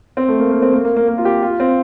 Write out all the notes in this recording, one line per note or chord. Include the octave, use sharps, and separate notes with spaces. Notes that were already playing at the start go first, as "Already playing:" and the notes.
C4
A3
A#3
A#3
C4
A#3
A#3
A#3
A#3
F4
G4
F4
C4